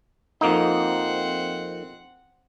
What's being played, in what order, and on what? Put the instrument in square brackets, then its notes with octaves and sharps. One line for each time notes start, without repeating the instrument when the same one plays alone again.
[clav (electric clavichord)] F2 A#3 D#4 [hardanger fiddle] C4 F#5